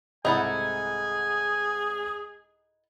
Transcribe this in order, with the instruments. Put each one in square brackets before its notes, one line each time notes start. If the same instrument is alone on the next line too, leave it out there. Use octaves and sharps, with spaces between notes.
[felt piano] C2 G#2 F#5 [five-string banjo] D#4 E4 A4 [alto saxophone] G#4 [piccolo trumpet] G#5